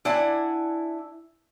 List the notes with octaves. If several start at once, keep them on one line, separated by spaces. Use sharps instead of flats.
D4 E4 F#5 G#5